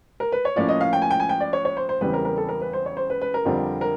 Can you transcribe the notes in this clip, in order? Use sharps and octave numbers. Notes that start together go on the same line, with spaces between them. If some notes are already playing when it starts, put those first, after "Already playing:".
A#4
B4
C#5
A2 F3 A#3 C#4 F4 D5
D#5
F5
G5
G#5
G5
G#5
G5
D5
C#5
C#5
C5
C5
E2 C#3 E3 G3 C4 B4
A#4
A#4
A4
A#4
B4
C5
C#5
C5
B4
B4
A#4
F2 D3 G3 C4 F4
A#4